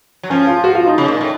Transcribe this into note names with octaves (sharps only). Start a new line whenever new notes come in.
F#3
F3 C#4
F4
F#4
F4
D#4
C#3
A#2
A2